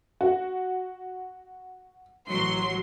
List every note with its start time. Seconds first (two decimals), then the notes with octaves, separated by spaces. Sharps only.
0.21 F#4
2.29 A1 F#3 C6